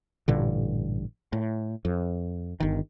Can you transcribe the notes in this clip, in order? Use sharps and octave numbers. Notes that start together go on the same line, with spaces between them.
A1 G2 A#2 D3
A2
F2
G1 D#3